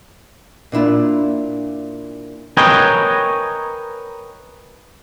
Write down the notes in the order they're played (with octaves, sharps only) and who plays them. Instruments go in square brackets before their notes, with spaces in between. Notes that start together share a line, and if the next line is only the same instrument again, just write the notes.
[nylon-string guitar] A#2 D4 E4 F4
[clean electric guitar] A#4 B4 C#5 D#5 G5 G#5